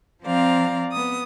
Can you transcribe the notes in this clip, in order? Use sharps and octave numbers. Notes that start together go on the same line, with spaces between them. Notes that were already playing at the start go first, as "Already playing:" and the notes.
F3 C4 D5 F5 A#5
B3 D#6